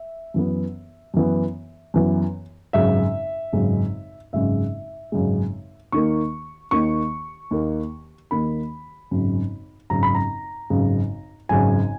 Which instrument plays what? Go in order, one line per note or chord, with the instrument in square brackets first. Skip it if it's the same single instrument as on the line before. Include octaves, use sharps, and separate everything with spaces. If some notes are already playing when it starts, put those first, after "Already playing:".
Already playing: [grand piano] E5
F#2 E3 B3
F#2 E3 B3
F#2 E3 B3
G#1 F#2 C#3 G#3 E5
G#1 F#2 C#3 G#3
G#1 F#2 C#3 G#3 E5
G#1 F#2 C#3 G#3
D#2 D#3 A#3 C#6
D#2 D#3 A#3 C#6
D#2 D#3 A#3
D#2 D#3 A#3 B5
G#1 F#2 C#3
G#1 F#2 C#3 A#5
B5
A#5
G#1 F#2 C#3
G#1 F#2 C#3 G#5